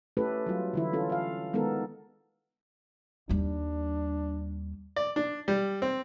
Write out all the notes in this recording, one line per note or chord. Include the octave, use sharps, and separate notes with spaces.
A3 C#4 E4 G4 A4 B4
F#3 G3 F4
D3 E3 E4
C#4 F4 A4
A4 F5
D#3 G#3 B3 D#4 A4 A#4
D#2 G3 D4
D5
D4
G3
C4